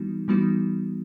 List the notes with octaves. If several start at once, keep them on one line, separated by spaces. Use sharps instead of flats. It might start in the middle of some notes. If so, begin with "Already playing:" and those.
Already playing: E3 G3 B3 D#4 F#4
E3 G3 B3 D#4 F#4